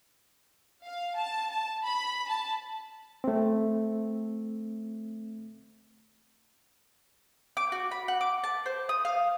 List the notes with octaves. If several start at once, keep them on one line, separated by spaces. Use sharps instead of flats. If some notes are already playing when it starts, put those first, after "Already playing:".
F5
A5
A5
B5
A5
A3 C4
D6
F#4
B5
F#5
D6
A5
C5
D#6
F5